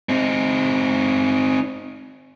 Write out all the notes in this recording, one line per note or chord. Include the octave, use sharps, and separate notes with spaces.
C4 D#4